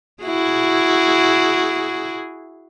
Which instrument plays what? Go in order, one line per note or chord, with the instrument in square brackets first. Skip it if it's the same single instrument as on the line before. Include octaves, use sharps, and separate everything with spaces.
[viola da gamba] E4 F#4 G#4